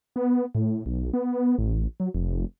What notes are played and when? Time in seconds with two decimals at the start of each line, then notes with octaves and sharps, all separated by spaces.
0.16 B3
0.55 A2
0.86 B1
1.14 B3
1.58 A1
2.00 F#3
2.14 F1